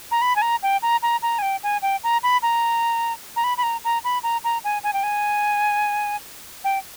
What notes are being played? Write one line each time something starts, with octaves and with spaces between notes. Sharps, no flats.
A#5
B5
G#5
A#5
G5
A#5
A#5
A#5
G#5
G5
G#5
G5
A#5
B5
A#5
A#5
B5
B5
A#5
A#5
B5
A#5
A#5
G#5
G#5
G5
G#5
G5